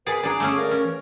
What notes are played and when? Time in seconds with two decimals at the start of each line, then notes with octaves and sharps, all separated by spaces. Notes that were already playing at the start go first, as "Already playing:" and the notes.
0.07 G#4 A#4 B4 D5 G#5
0.23 D4 G#4 G#5 A#5 D6
0.40 A3 C#4 G#4
0.58 A#4 D5 F5
0.71 C#4
0.84 E3